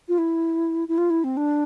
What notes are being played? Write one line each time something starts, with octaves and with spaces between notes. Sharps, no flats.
F4
E4
E4
F4
E4
C4
D4